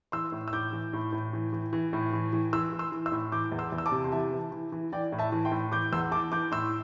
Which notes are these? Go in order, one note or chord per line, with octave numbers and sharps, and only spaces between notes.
E3 C6 E6
A2
E6
A2 D6 G6
E3
A2
A2
E3
E3
E3
A2
E3
E3
E3 C6 E6
E3
C6 E6
E3
C6 E6
A2
E3 D6 G6
E2
C6 E6
E2
E6
A5 D6
C3
C6
E3 E5 A5
E3
E3
E3
E3 D5 G5
A2
E5 A5
E3
G5 C6
A2
E3 D6 G6
E2 C6 E6
E3 A5 D6
E3 D6 G6
A2 C6 E6